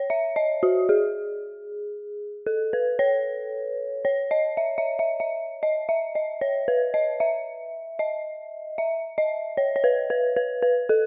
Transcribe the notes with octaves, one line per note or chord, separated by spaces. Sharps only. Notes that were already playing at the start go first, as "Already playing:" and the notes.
Already playing: C#5
E5
D#5
F#4
G#4
A4
B4
C#5
C#5
D#5
E5
E5
E5
E5
D#5
E5
D#5
C#5
B4
D#5
E5
D#5
E5
D#5
C#5
C#5
B4
B4
B4
B4
A4